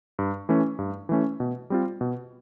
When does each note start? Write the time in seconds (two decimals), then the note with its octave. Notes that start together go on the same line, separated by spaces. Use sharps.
0.19 G2
0.49 E3 A3 C#4
0.79 G2
1.09 E3 A3 C#4
1.40 B2
1.70 G3 C4 F4
2.01 B2